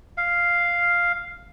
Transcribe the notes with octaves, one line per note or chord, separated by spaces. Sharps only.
F5